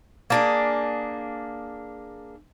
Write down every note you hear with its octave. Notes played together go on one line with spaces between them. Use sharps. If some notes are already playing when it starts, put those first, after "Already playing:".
A#3 D4 G#4